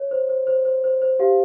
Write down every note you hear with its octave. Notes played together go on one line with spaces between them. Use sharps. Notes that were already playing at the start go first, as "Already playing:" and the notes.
Already playing: C#5
C5
C5
C5
C5
C5
C5
G4 F5